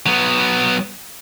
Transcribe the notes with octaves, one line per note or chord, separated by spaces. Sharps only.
F#3 B3